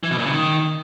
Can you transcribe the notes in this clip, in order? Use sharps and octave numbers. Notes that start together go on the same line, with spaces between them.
E3
B2
A#2
C#3
D#3